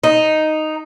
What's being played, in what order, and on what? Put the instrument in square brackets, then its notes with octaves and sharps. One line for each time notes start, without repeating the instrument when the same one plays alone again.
[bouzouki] D#4